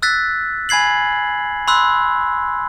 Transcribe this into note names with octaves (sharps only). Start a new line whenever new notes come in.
E6 F#6 A6 B6
G#5 B5 G#6 C7 F#7
B5 C6 E6 F#6